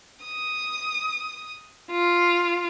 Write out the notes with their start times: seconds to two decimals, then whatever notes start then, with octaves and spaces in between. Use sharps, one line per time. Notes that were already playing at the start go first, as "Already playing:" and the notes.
0.24 D#6
1.92 F4